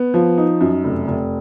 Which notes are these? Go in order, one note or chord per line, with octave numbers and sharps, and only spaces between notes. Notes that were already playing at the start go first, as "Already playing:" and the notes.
Already playing: B3
F3
D#4
F#2
F1
F1